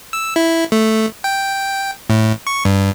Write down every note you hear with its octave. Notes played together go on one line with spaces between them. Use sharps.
E6
E4
A3
G5
A2
C#6
G2